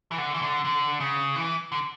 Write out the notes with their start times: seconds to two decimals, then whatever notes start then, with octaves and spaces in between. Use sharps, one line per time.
0.11 E3
0.18 D3
0.34 E3
0.42 D3
0.65 D3
1.00 C#3
1.36 E3
1.72 D3